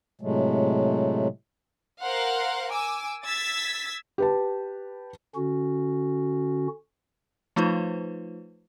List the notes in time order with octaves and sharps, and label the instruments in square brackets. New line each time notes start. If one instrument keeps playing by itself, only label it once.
[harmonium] A2 C3 F#3 G#3 A3
[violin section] A#4 C5 F5 F#5
G#5 D6 E6
E6 G#6 A6 B6
[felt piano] G4 B4 A5
[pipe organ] D3 C#4 F#4
[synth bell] F3 A3 D#4 F4 B4 C5